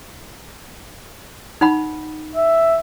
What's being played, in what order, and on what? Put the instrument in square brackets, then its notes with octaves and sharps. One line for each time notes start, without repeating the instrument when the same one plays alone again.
[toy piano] D#4 F#5 B5
[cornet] E5